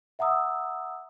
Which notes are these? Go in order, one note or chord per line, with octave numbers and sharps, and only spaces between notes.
E5 F#5 A#5 D#6 E6